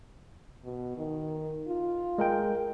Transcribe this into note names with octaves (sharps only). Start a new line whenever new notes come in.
B2
D#3
F4
G#3 A#4 G5